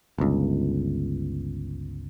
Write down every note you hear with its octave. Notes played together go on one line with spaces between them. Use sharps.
G1 C#2